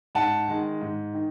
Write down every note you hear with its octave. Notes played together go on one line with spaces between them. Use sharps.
G#2 F#5 A5
D#3 G#3
G#2
D#3